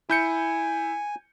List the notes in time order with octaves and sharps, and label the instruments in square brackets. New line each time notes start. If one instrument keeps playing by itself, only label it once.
[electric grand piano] E4 G6 C#7 [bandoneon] G#5